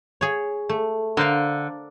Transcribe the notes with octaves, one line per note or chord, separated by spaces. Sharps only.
G#4 C#5
A3
D3 A#4 C5 F5